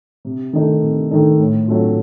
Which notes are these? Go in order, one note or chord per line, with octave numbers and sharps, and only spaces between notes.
C3
D#3 A3 D#4 A4
C3
D#3 A3 D#4 A4
A2
F#3 A3 C4 F4